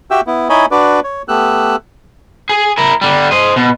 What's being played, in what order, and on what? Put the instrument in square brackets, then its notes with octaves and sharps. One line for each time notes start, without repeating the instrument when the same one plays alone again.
[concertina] F#4 G4 E5 G5 E6
B3 E4
D#4 E4 C#5 D#5 G#5 B5
D4 F#4 B4 D5
C#5
A3 B3 G4 E6 F#6
[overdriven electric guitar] G#4
E4 A#4
D3 G3
C5 D#5
B2